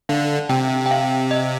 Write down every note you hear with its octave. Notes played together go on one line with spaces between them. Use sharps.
D3 F5
C3 G5
G5
F5
D#5